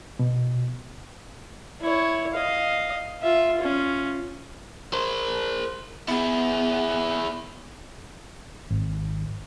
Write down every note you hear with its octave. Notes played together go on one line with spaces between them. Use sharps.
B2
E4 C#5
D#5 F5
F4 E5
C#4 F4
A#4 C5
B3 E4 G#4
G#1